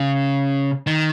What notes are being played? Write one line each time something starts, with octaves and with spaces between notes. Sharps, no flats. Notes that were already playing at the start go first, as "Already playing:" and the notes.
Already playing: C#3
D#3